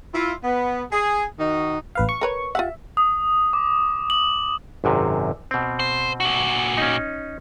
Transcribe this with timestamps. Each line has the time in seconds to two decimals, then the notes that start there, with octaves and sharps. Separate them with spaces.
0.14 E4 F4
0.43 B3
0.92 G#4
1.39 D#3 D#4 F#4
1.95 A1 B4 F5
2.09 C#6
2.21 A#4 B4 C#5
2.55 F4 G4 E5 F#5
2.97 D#6
3.53 D6
4.10 F#7
4.84 G#1 F#2 C3
5.51 B2 C4
5.80 C5
6.20 A#2 F#4
6.77 C#4 D#4